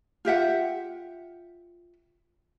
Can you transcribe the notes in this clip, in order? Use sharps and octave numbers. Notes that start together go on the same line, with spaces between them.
F4 G4 E5 F#5